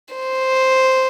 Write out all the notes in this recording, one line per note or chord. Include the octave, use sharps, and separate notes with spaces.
C5